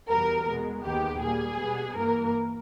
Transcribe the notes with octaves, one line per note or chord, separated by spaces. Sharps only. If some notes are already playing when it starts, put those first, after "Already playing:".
E2 B2 G3 B3 A#4
B2 G#3 B3
D#2 D#3 G#3 B3 G4
A#2 G3 A#3 G#4
B2 G3 B3
G2 E3 A#3 A#4